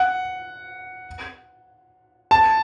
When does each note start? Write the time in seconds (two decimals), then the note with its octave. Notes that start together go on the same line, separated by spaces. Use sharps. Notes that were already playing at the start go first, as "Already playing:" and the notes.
Already playing: F#5
2.31 A5